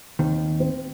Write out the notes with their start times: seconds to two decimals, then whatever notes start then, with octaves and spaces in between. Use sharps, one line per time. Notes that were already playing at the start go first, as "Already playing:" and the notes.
0.19 D#2 D#3 C4
0.60 C4